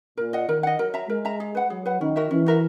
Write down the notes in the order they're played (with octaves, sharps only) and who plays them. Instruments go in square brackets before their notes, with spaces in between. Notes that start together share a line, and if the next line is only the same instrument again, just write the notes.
[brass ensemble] A#2 [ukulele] A#4
[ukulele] D#5 F#5
[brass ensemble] D#3 [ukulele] A#4
[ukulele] D#5 F#5
[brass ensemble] F#3 [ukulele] A#4
[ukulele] E5 A#5
[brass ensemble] G#3 [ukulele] A#4
[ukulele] E5 A#5
G#4
B4 F#5
[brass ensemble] F#3 [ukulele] G#4
[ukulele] B4 F#5
[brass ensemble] D#3 [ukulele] C#4
[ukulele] F#4 A#4 E5
[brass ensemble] E3 [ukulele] C#4
[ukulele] F#4 A#4 E5